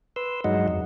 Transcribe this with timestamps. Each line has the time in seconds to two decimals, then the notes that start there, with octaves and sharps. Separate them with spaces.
0.16 B4 C6 E6
0.44 G2 F#3 G#3 D#4 D#5 F#5
0.68 F2 D#4